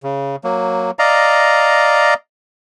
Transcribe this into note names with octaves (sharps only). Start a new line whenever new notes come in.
C#3
F#3 A#3
D5 D#5 F5 A#5